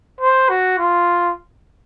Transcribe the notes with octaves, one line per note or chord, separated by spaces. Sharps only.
C5
F#4
F4